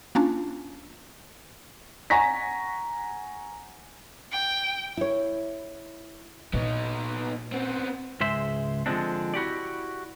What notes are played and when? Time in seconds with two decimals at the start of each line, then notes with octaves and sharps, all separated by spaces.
0.15 A#3 C#4 D4 F4
2.10 F#5 G#5 A#5 C#6 A#6 B6
4.32 G5
4.97 E4 C#5
6.54 A#2 B3 D#4
7.52 B3 C4
8.21 C#2 G#2 G#3 C5 E5
8.86 D3 F3 F#3 G#3 C4 D4
9.34 E4 F#4 G4 D5